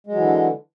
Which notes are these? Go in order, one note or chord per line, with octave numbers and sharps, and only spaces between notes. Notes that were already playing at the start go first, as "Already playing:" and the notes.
D3 E3 F#3 G#3